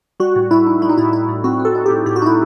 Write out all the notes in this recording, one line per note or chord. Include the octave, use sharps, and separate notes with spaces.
G3 F#4
A2
A2 E4
D#4
G3 E4
D#4
A2 E4
D#4 E4
A2
C4 F#4
C4
A4
D#4
A2 G4
A2 G4
F#4
D#4 E4